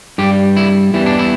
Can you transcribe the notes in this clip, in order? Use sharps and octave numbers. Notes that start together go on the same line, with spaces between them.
G2 G3 G4
E4
E2 E3 G3 E4
D4
E4